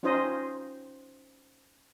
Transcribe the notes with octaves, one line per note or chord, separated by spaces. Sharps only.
C#4 D#4 F4 C5 D#5